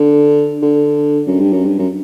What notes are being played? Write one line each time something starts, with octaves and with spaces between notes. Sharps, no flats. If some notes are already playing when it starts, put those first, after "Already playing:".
Already playing: D3
D3
F#2
G2
F#2
G2
F#2